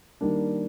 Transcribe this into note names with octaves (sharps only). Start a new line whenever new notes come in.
D#3 G3 A#3 D4